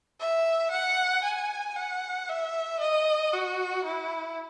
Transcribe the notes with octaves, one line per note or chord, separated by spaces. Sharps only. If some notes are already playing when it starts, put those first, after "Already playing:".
E5
F#5
G#5
F#5
E5
D#5
F#4
E4